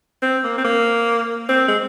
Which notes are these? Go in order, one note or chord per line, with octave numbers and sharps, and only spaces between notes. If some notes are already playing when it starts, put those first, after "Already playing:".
C4
A#3
C4
A#3
C4
G#3